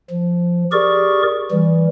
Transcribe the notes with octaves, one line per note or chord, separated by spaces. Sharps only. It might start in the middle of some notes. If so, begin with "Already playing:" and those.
F3
G4 G#4 A#4 D5 C#6
E3 G3